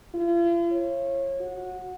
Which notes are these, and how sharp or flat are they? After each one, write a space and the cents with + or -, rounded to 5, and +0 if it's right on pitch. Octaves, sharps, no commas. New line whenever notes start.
F4 -45
C#5 -30
F#4 -15